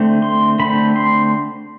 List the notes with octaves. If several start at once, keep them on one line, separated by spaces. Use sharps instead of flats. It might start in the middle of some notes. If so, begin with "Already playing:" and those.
Already playing: D3 A3 C4
C6
D3 A3 C4 B5
C6